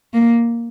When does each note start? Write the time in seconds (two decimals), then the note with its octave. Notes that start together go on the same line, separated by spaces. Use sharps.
0.14 A#3